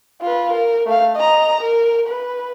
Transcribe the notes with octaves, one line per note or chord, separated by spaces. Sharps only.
F4 B4
A#4
A3 F5
D#5 A#5
A#4
B4